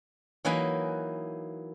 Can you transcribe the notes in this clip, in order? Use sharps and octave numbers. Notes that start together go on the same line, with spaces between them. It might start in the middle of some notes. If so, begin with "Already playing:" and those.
E3 F#3 A#3 D#4 B4 G#5